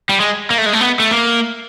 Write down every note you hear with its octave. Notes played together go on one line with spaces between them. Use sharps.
G3
G#3
A#3
A3
G#3
A3
B3
A3
A#3